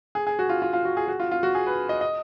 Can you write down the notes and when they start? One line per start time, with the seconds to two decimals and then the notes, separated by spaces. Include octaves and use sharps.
0.15 G#4
0.27 G#4
0.39 F#4
0.49 F4
0.62 F4
0.73 F4
0.85 F#4
0.97 G#4
1.08 F#4
1.20 F4
1.31 F4
1.43 F#4
1.55 G#4
1.67 B4
1.89 D#5
2.01 D#5